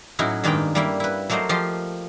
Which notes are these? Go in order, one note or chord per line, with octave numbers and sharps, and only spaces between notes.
A2 F#3 C#4 D#4 E4 F#4
G2 D#3 G#3 A#3 G5
G3 A#3 E4
E4 B4
F#3 A3 A#3 C5 D#5
F3 F4 G4 D#5 C6